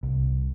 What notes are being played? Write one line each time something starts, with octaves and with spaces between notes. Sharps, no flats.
C2